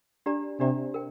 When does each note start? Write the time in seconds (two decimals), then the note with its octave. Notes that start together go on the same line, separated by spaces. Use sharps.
0.26 D4 G4 D5 A#5
0.60 C3 D4 G4 D5 A#5
0.94 A#4 G5